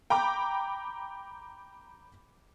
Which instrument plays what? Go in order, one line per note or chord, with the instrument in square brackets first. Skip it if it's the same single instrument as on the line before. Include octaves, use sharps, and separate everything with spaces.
[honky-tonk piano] G5 A#5 B5 D6 G6